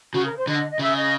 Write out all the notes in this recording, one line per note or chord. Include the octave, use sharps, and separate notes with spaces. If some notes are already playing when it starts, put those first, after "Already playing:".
C#3 F#4
A#4
C5
D3 D#5
D#5
C#3 E5
D#5